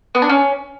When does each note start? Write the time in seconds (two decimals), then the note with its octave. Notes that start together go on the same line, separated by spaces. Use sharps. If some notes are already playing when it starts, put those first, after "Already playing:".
0.15 B3
0.22 D4
0.29 C#4